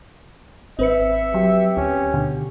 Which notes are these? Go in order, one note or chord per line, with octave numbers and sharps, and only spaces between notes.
G#1 C4 B4 E5 C#7
F#3 G4
D2 C#4
B2 D3